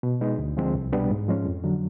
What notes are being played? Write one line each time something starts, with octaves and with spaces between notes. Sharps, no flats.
B2
G#3 B3 D#4
D2
D3 F3 G#3 C4
C2
B2 G3 B3 D4
G#2
F3 G#3 C#4
F2
D3 F#3